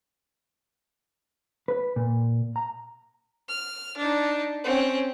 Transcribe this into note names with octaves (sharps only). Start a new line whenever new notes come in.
B4
A#2
A#5
F6
D4 D#4
C4 C#4